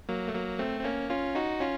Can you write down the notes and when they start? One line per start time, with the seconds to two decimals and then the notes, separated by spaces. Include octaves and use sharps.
0.09 F#3 A#3
0.28 A3
0.34 F#3 A#3
0.59 A3 C4
0.79 C4
0.85 A#3 C#4
1.10 C#4 F4
1.35 D#4 F#4
1.61 C#4 F4